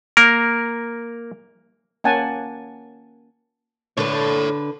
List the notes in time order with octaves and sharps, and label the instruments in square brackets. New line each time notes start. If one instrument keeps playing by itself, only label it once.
[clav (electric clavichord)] A#3 A#4
[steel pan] A#3 C#4 F#5 G#5 A5
[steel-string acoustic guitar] D3 B4 [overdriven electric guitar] A4 C#5